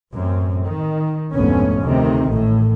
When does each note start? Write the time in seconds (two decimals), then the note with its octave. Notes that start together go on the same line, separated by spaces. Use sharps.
0.14 A1 F#2 C4
0.65 D#3
1.33 F1 D2 G#2 B3 C#4
1.80 D2 C3 D#3
2.29 A1 A2